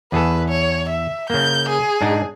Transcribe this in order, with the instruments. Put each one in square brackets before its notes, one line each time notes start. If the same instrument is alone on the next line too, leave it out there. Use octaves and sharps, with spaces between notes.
[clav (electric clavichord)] E2 G#4 A4 [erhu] B4
[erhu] C#5
E5
[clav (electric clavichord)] C#3 A#3 [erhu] G6
[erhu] G#4
[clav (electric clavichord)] G#2 D4 D#4